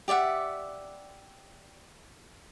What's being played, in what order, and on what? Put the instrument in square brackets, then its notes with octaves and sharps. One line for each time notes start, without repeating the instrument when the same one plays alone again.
[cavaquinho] G4 D5 E5 F#5